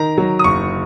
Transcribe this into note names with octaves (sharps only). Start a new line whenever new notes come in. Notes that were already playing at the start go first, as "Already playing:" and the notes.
Already playing: D#3 A#5
F#3
D#6
F#1 C#6